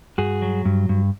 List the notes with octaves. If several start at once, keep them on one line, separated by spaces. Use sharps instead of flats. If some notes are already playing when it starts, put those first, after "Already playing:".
G2 F#4 G#4
F#3
G2
G2